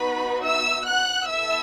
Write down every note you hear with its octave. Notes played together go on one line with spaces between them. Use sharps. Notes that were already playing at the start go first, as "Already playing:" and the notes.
Already playing: B3 D#4 F#4 B4 B5
E5 E6
F#5 F#6
B3 E4 A4 E5 E6